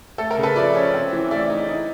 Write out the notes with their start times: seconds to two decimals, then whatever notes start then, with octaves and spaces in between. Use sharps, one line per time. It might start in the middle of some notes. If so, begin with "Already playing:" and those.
0.18 A3 A4
0.31 A#4
0.37 C#3
0.43 A4 B4
0.56 F3 D5 E5
0.75 C#4
0.94 C4
1.13 E3
1.31 A3 D5 E5
1.50 D#4
1.69 D#4